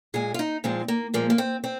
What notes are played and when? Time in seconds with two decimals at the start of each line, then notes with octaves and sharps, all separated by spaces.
0.14 A#2 G#3 G#4
0.34 F4
0.39 D#4
0.64 A#2 F3 G#3 C4
0.88 A#3
1.14 A#2 F3 G#3 A#3
1.30 A#3
1.38 C4
1.64 C4